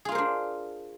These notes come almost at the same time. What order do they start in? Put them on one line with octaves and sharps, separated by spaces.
G#4 F4 A#4 C5 D4